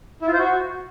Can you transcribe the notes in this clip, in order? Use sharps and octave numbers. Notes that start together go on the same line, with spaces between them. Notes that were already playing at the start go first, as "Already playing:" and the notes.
E4
F4
C5
F#4